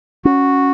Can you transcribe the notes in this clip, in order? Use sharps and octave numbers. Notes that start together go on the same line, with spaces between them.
C#4 F#4